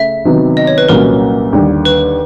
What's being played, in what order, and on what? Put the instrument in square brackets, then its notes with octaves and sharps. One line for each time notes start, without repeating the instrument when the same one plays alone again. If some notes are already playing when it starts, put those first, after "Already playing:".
Already playing: [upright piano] C#3 A3 [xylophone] E5
[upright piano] C3 D#3 F#3 B3 D#4
[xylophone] D#5
C#5
B4
[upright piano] C2 A#2 F#3 A#3 C#4 [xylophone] A#4
[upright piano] D#2 D3 G3
[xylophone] B4